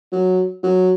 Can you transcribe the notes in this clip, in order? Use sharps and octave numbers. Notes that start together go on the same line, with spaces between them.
F#3
F#3